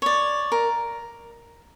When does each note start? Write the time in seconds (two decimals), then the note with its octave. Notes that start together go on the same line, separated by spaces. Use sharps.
0.02 C#5 D5
0.52 A#4